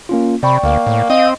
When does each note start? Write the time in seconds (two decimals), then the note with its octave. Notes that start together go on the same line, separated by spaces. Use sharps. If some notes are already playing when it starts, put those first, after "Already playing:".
0.09 A#3 C#4 F4
0.43 C3 D5 G5 B5 C#6
0.63 D2 A#3 F5
0.87 A2
1.10 C4 D#5